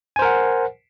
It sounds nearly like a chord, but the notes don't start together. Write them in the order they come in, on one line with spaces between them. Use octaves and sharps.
G#5 C5 A#4 F#5